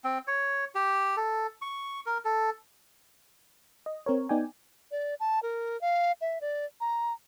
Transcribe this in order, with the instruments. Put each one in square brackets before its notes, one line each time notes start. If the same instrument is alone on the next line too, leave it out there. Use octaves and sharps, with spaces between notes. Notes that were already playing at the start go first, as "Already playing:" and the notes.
[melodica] C4
C#5
G4
A4
C#6
A#4
A4
[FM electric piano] D#5
C4 A#4 C#5
B3 D#4 D5 G5 G#5
[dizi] D5
A5
A#4
F5
E5
D5
A#5